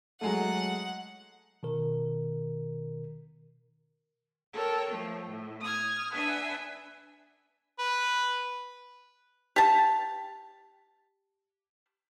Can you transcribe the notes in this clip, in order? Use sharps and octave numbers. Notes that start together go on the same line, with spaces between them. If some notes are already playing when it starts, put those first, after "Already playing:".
F#3 G#3 A3 F#5
B2 D#3 A#4
A4 A#4 C#5 G5
F3 A3
A2
D#6 F6 G#6
D4 B4 E5 F#5 G#5
B4
G4 A5